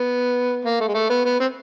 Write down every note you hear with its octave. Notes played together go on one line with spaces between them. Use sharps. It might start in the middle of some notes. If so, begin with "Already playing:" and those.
Already playing: B3
A#3
A3
G#3
A3
B3
B3
C4